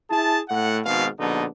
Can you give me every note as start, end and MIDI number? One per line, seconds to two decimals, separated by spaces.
0.10 0.40 64
0.10 0.40 68
0.10 0.40 81
0.49 0.80 45
0.49 0.80 78
0.85 1.08 32
0.85 1.08 44
0.85 1.08 47
0.85 1.08 77
1.18 1.45 34
1.18 1.45 47
1.18 1.45 50
1.18 1.45 63